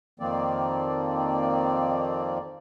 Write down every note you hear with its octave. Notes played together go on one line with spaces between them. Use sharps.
F2 D#3 F3 A#3 C4 D5